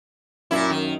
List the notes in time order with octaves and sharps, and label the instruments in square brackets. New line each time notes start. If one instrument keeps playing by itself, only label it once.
[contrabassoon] F#2 [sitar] A#2 E4
[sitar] D#3